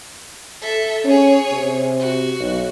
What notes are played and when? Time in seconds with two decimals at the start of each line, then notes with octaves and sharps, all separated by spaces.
0.61 A4 E5
1.05 C#4 G#4 C#5
1.52 C3
2.00 F#4
2.40 B1